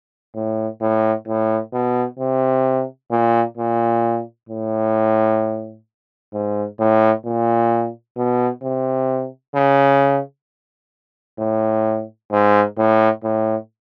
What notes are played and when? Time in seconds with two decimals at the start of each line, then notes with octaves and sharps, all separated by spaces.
0.36 A2
0.81 A2
1.28 A2
1.73 B2
2.19 C3
3.11 A#2
3.57 A#2
4.49 A2
6.33 G#2
6.80 A2
7.26 A#2
8.17 B2
8.63 C3
9.55 C#3
11.39 A2
12.32 G#2
12.78 A2
13.24 A2